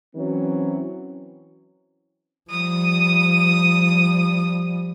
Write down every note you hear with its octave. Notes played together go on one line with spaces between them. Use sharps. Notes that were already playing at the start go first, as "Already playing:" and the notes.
E3 F#3 C4 C#4
F3 G3 D#6